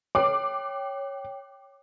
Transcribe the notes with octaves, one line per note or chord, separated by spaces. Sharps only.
C#5 G5 D6